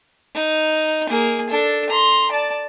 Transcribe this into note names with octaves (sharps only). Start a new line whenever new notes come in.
D#4
A#3 G#4
D4 A4
A#5 C6
D5 A5